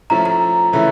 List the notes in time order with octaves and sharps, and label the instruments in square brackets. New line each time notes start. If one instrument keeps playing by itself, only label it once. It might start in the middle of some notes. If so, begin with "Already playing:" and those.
[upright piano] F3 A3 C#4 E4 [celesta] A#5
[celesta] A#5
[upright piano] C#3 E3 A3 C#4 E4